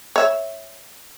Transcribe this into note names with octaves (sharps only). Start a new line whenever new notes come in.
C#5 E5